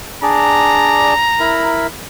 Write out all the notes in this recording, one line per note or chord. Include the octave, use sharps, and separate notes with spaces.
D4 G#4 D5 A#5
E4 A#4 B5